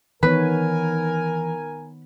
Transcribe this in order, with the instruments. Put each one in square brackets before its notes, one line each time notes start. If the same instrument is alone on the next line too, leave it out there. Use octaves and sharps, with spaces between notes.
[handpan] D#3 B3 C#5 [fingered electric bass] E3 [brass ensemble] A#4 G#5 [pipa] B4